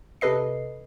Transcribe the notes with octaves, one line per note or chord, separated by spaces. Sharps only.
C3 A4 B4 D#5 C7